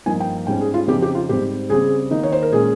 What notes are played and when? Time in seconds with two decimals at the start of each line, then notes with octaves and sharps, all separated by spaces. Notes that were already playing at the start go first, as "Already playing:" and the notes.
0.06 G2 F3 A#3 D#4 G#5
0.20 G5
0.47 G#2 G3 C#4 G5
0.61 G#4
0.74 F4
0.88 F2 C#3 F3 C4 D#4 G4
1.02 G4
1.15 F4
1.29 G#2 G3 C4 G4
1.69 C#3 G3 C4 G#4
2.11 D#3 A#3 D#4
2.23 C#5
2.32 C5
2.42 A#4
2.52 A#2 G#3 C#4 G#4